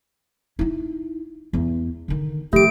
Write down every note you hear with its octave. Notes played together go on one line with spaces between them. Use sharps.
D#4 E4
E2
D3 D#3
D#3 F3 A3 G4 D7